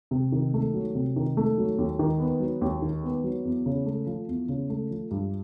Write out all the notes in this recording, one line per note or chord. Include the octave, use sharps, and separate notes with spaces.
C3
D#3
A3
F#3
C3
D#3
A3
F#3
D#2
D#3
B3
F#3
D#2
D#3
B3
F#3
E2
C#3
A3
F3
E2
C#3
A3
F3
G2